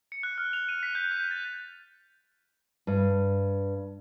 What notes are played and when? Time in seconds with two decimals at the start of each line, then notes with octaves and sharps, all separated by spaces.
0.12 C#7
0.23 F#6
0.38 F6
0.53 F7
0.69 D#7
0.83 B6
0.95 G6
1.11 G6
1.31 A6
2.87 G2